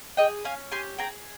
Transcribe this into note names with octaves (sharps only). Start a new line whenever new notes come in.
G#4 D#5 G5
C#4 F5 G#5
G4 G#5 C6
G#4 G5 A#5